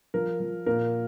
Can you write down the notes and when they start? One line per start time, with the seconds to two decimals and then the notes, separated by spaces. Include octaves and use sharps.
0.14 F3 A#4
0.40 F3
0.66 A#2 A#4